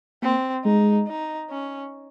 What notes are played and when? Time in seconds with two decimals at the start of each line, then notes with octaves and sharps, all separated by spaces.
0.22 A#3 C4
0.65 G#3 D#4
1.07 D#4
1.50 C#4